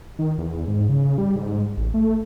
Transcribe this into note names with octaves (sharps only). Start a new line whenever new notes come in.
D#3
E2
G#2
C#3
G3
G#2
A1
A3